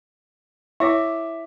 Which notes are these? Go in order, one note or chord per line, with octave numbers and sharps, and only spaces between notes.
E4 C#5 E5 D6